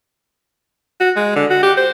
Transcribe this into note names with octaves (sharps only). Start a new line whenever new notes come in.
F#4
G#3
D3
F#4
G4
C5